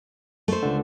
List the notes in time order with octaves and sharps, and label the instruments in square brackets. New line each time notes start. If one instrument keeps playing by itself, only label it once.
[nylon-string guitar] A3 C5
[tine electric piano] C#2 D3